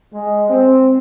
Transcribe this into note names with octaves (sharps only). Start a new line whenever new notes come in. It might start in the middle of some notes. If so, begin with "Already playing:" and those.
G#3
C4